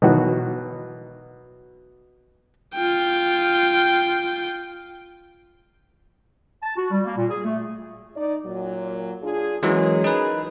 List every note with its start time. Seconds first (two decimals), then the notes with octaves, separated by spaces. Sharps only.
0.02 B2 D#3 E3 F#3 F#4
2.74 F4 G5
6.63 A5
6.76 F#4
6.91 G3
7.05 A#3
7.17 A#2
7.29 G#4
7.45 A3
8.16 D#4 D5
8.45 A#2 F#3
9.23 D4 F4 G#4
9.63 E3 F#3 G#3 C#4 G#4 A#4
10.04 D#4 B4